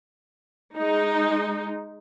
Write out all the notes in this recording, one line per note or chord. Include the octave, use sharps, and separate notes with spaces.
G#3 D#4